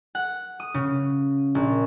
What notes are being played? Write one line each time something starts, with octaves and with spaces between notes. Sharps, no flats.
F#5
D#6
C#3
A#1